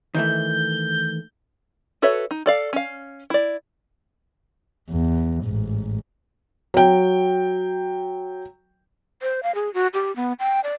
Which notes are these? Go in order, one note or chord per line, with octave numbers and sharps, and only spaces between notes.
D#3 E3 A3 G6
F#4 A4 B4 C#5 E5
D#4
A4 D5 F5
C#4 F5
E4 D5
E2
A1 G#2
F#3 G5
C5
F5
G#4
F#4
G4
B3
G5
D5